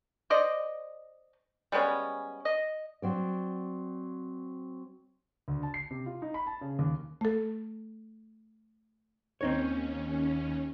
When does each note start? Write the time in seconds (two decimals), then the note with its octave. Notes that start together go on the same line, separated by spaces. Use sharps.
0.30 C5 D5 D#5
1.72 G3 G#3 B3 C#4
2.45 D#5
3.02 F#3 C4 D5
5.48 D2
5.63 A5
5.74 C7
5.91 C3
6.06 F4
6.22 D#4
6.34 B5
6.47 A5
6.61 C#3
6.79 D#2
7.21 A3 A4
9.41 D#2 C4 C#4 D#4 C#5